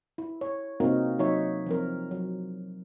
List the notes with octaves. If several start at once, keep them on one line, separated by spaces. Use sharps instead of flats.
E4
C#5
C3 A#3 C4 D#4 F#4 A#4
F#3 D#4 C#5 E5
F3 C4 A#4
F#3